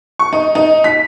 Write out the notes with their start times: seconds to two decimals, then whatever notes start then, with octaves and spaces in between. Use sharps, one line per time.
0.19 C#6
0.33 D#4
0.55 D#4
0.84 B6